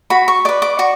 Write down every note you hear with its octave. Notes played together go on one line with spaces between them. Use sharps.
F#4 B5
C#6
B4 D5 D6
D6
F#4 C#6